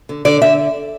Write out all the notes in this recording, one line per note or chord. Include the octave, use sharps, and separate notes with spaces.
D3
D3 D5
D3 E5